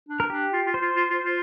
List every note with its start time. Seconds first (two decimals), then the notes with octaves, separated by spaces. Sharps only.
0.09 D4
0.20 A#4
0.30 D4 G4
0.53 F4
0.66 F4
0.74 C5
0.82 F4
0.96 F4
1.10 F4
1.24 F4